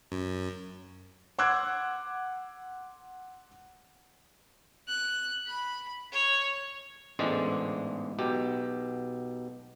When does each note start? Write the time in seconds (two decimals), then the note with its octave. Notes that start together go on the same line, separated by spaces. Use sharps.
0.12 F#2
1.39 F#5 C6 D6 E6 F#6 G#6
4.88 F#6
5.47 B5
6.12 C#5
7.19 A1 E2 G#2 D3 G#3 D5
8.19 B1 B2 G4